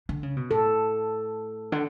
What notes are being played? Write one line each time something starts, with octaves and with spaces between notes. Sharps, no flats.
D3
C#3
B2
A2 A4
D3